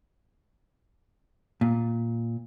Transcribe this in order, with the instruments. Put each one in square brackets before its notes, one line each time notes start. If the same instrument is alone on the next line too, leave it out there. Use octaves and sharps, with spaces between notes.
[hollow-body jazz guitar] A#2